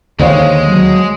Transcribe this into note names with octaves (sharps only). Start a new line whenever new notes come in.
D#2 D3 G#3 C5 C#5 F5
F#3